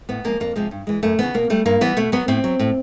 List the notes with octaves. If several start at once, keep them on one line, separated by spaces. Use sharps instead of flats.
A2 B3
F3 G#3 A#3
F2 A#3
C3 F3 G#3
G2
E3 G#3
F#2 A3
C#3 E3 B3
B2 A#3
G3 A3
G2 A#3
E3 G3 B3
B2 A3
F#3 B3
A2 C4
F#3
A2